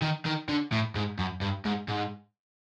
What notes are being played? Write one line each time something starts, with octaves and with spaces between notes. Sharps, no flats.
D#3
D#3
D3
A2
G#2
F#2
G2
G#2
G#2